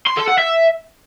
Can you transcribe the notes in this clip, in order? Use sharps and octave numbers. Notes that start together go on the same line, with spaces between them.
C6
A4
F#5
E5